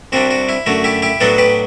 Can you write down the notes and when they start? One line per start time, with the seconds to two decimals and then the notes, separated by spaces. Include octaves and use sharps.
0.12 C2 C3 G3 D4 F#4
0.31 F#4
0.49 E4
0.66 F#2 D3 A3 F#4
0.84 E4 G4
1.02 E4 G4
1.20 A2 F#3 B3 D4 F#4 A4
1.38 G4 B4